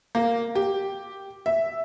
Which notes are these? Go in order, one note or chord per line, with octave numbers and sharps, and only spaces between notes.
A#3
G4
E5